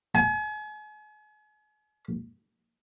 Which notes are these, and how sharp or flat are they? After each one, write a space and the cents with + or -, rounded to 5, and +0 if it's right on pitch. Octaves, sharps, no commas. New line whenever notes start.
G#5 +40